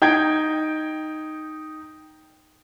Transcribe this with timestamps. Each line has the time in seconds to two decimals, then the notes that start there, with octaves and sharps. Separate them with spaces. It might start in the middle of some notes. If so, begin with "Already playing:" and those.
0.02 D#4 G5 G6 G#6 D7